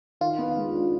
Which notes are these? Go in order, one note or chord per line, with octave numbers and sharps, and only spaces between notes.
D#3 F4
B3
G#3
D4